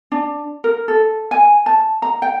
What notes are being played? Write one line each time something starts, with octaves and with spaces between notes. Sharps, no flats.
D4
A#4
A4
G#5
A5
A#5
G5